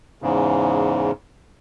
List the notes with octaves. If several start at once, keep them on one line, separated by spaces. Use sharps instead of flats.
E2 G#2 C#3